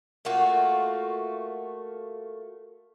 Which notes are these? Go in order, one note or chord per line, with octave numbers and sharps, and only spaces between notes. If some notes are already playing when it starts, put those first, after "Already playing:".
A3 A#3 F4 F#4